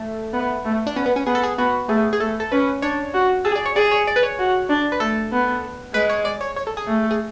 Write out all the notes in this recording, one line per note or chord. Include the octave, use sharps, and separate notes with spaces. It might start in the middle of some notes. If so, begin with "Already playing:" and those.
Already playing: A3
B3
A3
D4
B3 C#4
B3
C#4
B3 G#4
A4
G#4
B3 F#4
A3 G#4
G#4
A3 A4
A4
C#4 B4
D4 C#5
F#4
G#4 A4
D5
C#5
G#4 D5
C#5
D5
B4
C#5
F#4
D4
B4
A3 A4
B3
G#3 B4
C#5
D5
C#5
C#5
A4
G#4
A3
G#4